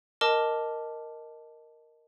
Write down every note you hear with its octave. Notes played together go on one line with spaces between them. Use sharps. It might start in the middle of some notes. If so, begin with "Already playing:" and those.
A#4 D#5 A5 D6 F6